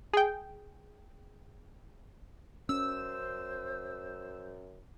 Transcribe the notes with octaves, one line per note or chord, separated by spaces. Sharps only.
G#4 G5
F#2 C#4 C5 E6